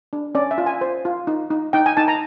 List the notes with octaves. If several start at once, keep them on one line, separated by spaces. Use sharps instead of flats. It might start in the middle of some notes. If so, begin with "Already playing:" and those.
D4
C#4 D5
E5
F4
G#5
C5
F4
D#4
D#4
D#4 G5
G#5
D#4 A5
A#5